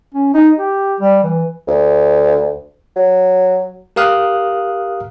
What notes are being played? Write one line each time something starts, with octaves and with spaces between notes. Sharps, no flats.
C#4
D#4
G4
G3
E3
D2
F#3
G4 A#4 F5 D#6 F6 F#6